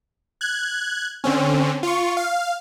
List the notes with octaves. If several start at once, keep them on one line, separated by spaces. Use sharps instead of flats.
F#6 G#6
D3 C4 C#4
F4 C#6
F5